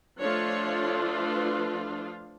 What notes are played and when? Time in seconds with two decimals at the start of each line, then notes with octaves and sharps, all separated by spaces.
0.20 F3 A3 D4 F4 C#5
1.13 B4